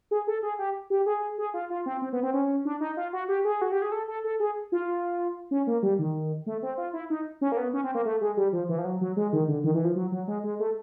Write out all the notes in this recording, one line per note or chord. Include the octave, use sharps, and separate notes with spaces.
G#4
A4
G#4
G4
G4
G#4
G#4
F4
F4
C4
C4
B3
C4
C#4
D4
D#4
F4
F#4
G4
G#4
F#4
G4
G#4
A4
A4
A4
G#4
F4
C#4
A#3
G3
D#3
A3
C4
F4
E4
D#4
C#4
A#3
B3
C#4
C4
A#3
A3
G#3
G3
F3
E3
F3
F#3
F#3
G#3
D#3
D3
D#3
E3
F3
F#3
F#3
G#3
G#3
A3